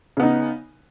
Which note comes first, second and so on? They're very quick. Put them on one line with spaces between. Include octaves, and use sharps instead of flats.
C#3 B3 D#4